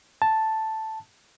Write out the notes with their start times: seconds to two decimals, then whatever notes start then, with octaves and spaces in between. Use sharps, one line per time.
0.22 A5